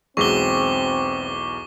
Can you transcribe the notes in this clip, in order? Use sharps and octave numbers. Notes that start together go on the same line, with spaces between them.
B1 E2 G#3 C4 F#4 C#6 D6 G7